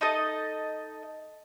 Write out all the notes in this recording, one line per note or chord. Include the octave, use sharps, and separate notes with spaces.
D#4 A4 D#5